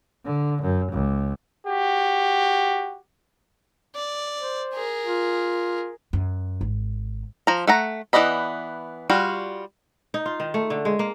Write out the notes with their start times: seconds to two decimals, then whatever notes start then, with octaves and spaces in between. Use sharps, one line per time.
0.25 D3
0.62 F#2
0.92 C#2
1.66 F#4 G4
3.95 D5
4.39 C5
4.74 G#4 A#4
5.06 F4
6.13 F#2
6.61 G#1
7.47 F3 A#5
7.67 A3 F#5 A#5
8.13 E3 B3 D5 D#5 B5
9.10 G3 F4 F#4
10.14 D#4
10.26 F4
10.40 D#3
10.54 A3
10.70 D3
10.85 G#3
10.99 A#3